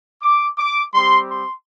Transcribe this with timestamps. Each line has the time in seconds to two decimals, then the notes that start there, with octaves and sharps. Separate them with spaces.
0.22 D6
0.58 D6
0.94 G3 C4 G4 C6
1.29 C6